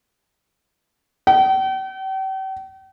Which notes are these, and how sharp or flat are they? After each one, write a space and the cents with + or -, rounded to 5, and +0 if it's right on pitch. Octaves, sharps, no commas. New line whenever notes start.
G5 -40